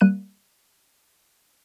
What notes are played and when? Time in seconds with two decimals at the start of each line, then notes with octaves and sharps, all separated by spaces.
0.01 G3 A#3 F#6 D#7